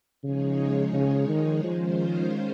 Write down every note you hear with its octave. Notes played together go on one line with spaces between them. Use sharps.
C#3 F3 G#3 D#4 G#4 C#5
C#3
D#3
D#3 F3 G#3 C#4 F4 C5